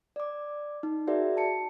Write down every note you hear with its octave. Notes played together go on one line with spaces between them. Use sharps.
D5 D6
D#4
F#4 G#4 A#4 D5 E5
A5 C#7